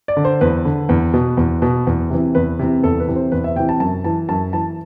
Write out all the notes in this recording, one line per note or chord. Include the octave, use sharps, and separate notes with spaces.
D5
D3
C5
E2 B4
D3
E2
B2
E2
B2
E2
C3 E3
E2 B4
C3 E3
E2 A4
B4
C3 E3
C5
E2 B4
E5
C3 E3 G5
A5
F#2 A5
E3 A5
F#2 A5
E3 A5